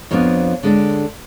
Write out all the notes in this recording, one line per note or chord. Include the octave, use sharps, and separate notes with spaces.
F2 F3 B3 D4 C#5
D3 G#3 D4